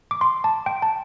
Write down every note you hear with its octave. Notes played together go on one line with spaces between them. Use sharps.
D6
C6
A5
G5
A5